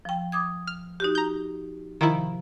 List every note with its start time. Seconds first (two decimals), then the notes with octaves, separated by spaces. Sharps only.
0.05 F3 G5
0.32 D6 D#6 G#6
0.67 F6
1.00 D#4 F#4 G4
1.15 A#5 G6
2.01 C3 D#3 F3 E4 A#5